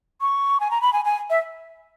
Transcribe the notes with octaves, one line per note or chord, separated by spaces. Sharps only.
C#6
G#5
A#5
B5
G#5
G#5
E5